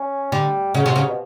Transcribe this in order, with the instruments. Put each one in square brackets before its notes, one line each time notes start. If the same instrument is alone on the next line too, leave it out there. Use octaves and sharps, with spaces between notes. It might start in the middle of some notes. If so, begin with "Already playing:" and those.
Already playing: [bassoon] C#4
[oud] D3 [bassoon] G3
[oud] C#3 [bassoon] F#3
[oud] C3
C#3
[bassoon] B2